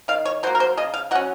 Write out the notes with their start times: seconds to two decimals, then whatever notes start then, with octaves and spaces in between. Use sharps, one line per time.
0.08 D#3 F5
0.25 C#5
0.43 F#3 C5
0.47 A#3
0.55 A#4
0.60 C5
0.77 C#3 D#5
0.94 F5
1.11 F#3 F#5
1.15 C#4